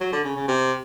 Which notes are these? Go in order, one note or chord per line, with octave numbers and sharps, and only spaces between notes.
F#3
D3
C#3
C#3
C3